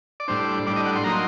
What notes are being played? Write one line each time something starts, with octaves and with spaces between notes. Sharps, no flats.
D5
A2 G3 D4 C5
A2 G3 D4 D5
D#5
F#5
C6
F#3 A#3 D#4 A#5
C6